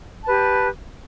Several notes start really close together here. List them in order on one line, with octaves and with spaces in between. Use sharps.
A5 B4 G4